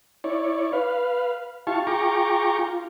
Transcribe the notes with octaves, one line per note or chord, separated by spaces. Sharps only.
E4 C#5 D5
B4 F5
E4 F4 G4 F5 A5 C#6
F4 G#4 G5 A#5 C#6 D6
F4